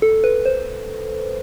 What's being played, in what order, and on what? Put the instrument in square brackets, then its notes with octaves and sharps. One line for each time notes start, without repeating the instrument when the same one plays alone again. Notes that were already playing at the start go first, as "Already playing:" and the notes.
[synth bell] A4
B4
C5